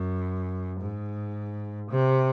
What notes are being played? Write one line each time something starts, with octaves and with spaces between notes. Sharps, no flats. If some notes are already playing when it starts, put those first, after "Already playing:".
Already playing: F#2
G#2
C3